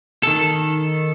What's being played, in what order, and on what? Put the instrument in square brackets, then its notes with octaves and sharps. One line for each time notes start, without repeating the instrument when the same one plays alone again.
[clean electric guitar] D#3 A4